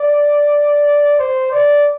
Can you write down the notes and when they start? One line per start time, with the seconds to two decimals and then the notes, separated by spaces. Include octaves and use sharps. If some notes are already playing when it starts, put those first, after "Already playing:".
Already playing: D5
1.19 C5
1.51 D5